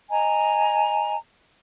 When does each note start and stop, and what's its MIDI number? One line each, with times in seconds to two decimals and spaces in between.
0.10 1.16 75
0.10 1.16 80
0.10 1.16 82